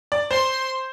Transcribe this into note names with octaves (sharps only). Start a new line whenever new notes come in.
D5
C5 C6